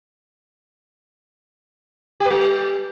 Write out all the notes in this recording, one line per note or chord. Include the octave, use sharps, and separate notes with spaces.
G4
B4
G3